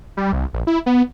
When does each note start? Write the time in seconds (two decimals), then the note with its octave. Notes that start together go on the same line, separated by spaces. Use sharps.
0.17 G3
0.33 C2
0.53 A#1
0.67 E4
0.86 B3